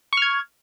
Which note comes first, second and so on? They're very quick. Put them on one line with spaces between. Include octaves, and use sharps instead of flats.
C#6 F6 G#6